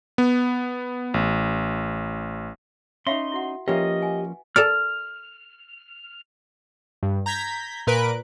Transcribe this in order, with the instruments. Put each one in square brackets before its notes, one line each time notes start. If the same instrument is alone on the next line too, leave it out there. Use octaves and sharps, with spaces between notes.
[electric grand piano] B3
A1
[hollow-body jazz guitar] C#4 D#4 [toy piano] E5 F5 B5 [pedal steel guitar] C6
[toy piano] E4 F#4 F#5
[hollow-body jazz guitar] F3 A#3 C#4 [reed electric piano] G4 [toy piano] B4 E5 [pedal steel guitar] D#5
[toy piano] F#5 G#5
[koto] A4 A#4 D5 [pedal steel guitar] F6
[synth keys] G2
A#5 G6 G#6 B6
A#2 A#4 B4 F#6 D7